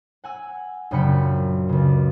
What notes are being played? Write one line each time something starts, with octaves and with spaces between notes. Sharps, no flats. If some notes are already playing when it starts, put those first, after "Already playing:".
F#5 G#5 E6
A#1 F#2 C#3 G5 B5 C#7
C#2 C#3